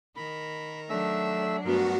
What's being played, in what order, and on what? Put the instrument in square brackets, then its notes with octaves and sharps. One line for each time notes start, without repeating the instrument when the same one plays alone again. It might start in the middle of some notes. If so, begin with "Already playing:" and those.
[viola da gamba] D#3 A#4 [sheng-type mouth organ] B5
[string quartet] F#3 D4 [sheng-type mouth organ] A3 E5 E6
[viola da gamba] G2 A3 B3 [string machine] F#4 [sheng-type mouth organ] A#4